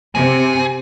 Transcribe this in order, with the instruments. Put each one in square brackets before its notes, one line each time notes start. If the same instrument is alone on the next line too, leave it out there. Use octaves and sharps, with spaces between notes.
[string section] C3 [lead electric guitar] G#4